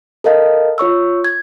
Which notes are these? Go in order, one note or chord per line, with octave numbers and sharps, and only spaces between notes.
A4 A#4 D#5 F5
F4 C#5 C#6 E6
G#6